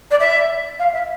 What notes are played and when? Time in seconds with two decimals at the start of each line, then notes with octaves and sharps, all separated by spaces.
0.10 D5
0.19 E5
0.79 F5
0.92 E5